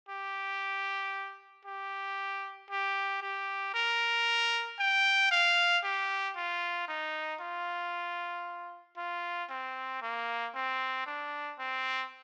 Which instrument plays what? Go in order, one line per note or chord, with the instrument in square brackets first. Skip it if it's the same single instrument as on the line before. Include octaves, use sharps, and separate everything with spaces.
[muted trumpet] G4
G4
G4
G4
A#4
G5
F5
G4
F4
D#4
F4
F4
C4
A#3
C4
D4
C4